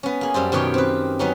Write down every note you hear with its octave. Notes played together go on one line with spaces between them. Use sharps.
B3 C#4
A#3 G#4
F#2 G3 A4 C5
F#2 B2 D#3 G4 C#5 G5
C4 B4
F#3 B3 C#4 D#4